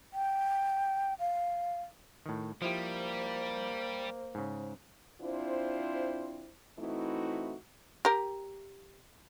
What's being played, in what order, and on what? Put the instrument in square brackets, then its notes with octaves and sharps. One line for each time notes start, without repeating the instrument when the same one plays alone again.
[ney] G5
F5
[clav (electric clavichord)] A2 D#3
[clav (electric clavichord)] F3 E4 G4 [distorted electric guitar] G3 [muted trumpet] A#3 [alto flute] C5
[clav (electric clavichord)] G#2 C#3
[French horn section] C4 D4 E4 F4 C5
E3 A3 C4 D#4 E4 F#4
[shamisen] G4 A#4